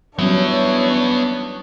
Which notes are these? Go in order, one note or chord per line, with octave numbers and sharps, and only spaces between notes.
F#3 G3 B3 C#4 D4 E4 C#5